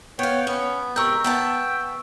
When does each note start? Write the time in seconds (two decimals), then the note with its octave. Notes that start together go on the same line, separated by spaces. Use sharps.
0.19 B3 C#5 F5 G5
0.47 B3 C#4
0.96 G#2 C3 A#4 G5 C#6 E6 G6
1.24 B3 E5 G5 A5